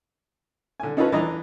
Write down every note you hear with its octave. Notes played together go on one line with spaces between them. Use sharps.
D3 G#5
C#4 D#4 F4 A4 B4 C#5
E3 D4 D#5 A#5